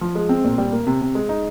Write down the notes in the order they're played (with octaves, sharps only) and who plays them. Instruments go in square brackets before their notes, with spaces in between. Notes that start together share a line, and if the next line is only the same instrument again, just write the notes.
[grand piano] F3
G#3
C4
A#2
G3
A#3
C3
C3
G#3
D#4